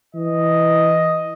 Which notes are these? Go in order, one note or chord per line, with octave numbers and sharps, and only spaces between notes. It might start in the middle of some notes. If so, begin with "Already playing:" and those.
E3 D#5